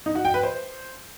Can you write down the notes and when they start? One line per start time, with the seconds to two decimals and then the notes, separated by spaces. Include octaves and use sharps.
0.06 D#4
0.15 F#4
0.25 G5
0.34 B4
0.43 C5